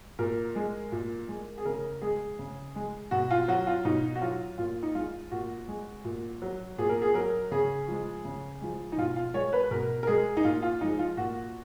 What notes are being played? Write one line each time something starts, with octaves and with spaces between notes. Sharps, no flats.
A#2 A#4
G#3
A#2
G#3
G#4
C#3 A#4
G#3 G#4
C#3
G#3
B2 F#4
F4
F#3 F#4
F4
B2 D#4
F#4
F#3 F4
A#2 F4
D#4
G#3 F4
A#2 F#4
G#3
A#2
F#3
A#2 G#4
A#4
G#4
F#3 A#4
C#3 G#4
F3 G#3
C#3
F3 G#3
D#4
B2 F4
F4
G#3 C#5
B4
B2 A#4
A#4
G#3 G#4
D#4
A#2 F4
F4
F3 G#3 D#4
F4
A#2 F#4